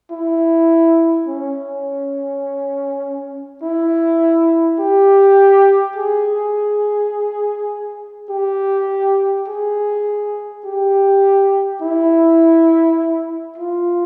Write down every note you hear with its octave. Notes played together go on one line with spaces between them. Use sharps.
E4
C#4
E4
G4
G#4
G4
G#4
G4
E4
F4